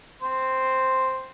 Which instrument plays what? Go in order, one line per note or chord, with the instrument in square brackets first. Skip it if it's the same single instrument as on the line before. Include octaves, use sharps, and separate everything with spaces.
[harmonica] C4 C5